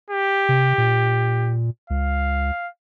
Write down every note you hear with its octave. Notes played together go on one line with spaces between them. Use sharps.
G4
C3
A#2
C#2 F5